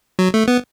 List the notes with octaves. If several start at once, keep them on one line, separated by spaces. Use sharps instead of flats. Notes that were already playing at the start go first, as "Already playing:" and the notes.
F#3
A3
B3